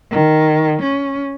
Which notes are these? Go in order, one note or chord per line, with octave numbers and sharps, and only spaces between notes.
D#3
C#4